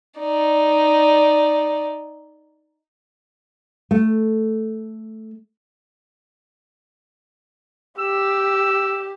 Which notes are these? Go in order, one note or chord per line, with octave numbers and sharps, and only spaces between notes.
D#4 D5
A3
G4 E6